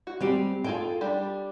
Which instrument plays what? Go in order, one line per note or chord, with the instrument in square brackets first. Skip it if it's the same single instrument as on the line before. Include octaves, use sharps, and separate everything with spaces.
[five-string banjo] F#4
[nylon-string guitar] G3 C4 G4 [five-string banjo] G#3
[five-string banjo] F4 G#4 A4 [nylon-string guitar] G5
[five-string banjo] G3 D4 G4